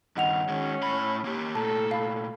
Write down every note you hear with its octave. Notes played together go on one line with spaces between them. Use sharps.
G2 D#3 D#5 F#5 F7
D#3 G#3 C#4
A2 B5
A#3 G4
A#2 A3 A4 A5 A#5
F5 B5